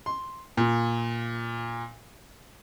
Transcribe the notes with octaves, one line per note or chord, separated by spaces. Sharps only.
C6
A#2